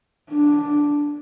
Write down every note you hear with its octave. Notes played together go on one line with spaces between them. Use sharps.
D4